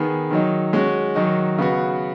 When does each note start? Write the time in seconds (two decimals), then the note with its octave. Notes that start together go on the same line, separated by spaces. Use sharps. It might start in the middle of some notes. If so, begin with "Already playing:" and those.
Already playing: D#3 B3 G#4
0.30 D#3 F#3 D#4
0.73 G#3 C#4 F#4
1.15 D#3 F#3 D#4 F#4
1.58 C#3 B3 F#4